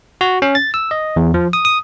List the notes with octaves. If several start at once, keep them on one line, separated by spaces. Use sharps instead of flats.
F#4
C#4
A6
E6
D#5
E2
F3
D#6
D#6